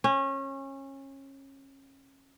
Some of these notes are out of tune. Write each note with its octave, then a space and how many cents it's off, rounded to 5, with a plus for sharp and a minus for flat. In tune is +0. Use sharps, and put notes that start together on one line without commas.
C#4 -25